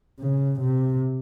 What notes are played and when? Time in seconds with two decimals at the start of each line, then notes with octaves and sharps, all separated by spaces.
0.20 C#3
0.61 C3